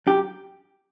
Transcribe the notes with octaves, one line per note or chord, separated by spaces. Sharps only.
F#2 G4